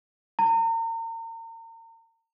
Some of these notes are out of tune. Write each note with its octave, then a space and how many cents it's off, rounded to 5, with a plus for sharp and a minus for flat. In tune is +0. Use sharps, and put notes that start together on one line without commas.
A#5 -40